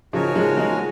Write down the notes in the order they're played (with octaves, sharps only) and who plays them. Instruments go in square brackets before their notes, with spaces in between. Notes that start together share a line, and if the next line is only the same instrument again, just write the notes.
[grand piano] C#3 F3 [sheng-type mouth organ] D#4 F#4 A#4 C#5 G#5
[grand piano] F3 G#3
F3 G#3